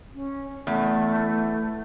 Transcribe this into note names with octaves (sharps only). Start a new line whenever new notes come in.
C#4
E2 A3